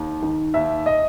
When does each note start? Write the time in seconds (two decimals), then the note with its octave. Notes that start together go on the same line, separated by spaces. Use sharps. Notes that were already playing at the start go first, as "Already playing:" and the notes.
Already playing: D#2
0.22 D#3
0.54 D#2 E5
0.86 D#5